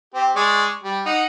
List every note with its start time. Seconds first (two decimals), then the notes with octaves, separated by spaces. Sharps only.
0.14 C4 G4
0.36 G#3 D5 C#6
0.84 G3
1.06 D#4 F#5